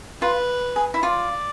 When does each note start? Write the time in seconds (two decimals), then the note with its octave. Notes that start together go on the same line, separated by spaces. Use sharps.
0.21 F4 B4
0.76 G#4
0.94 E4
1.03 F4 D5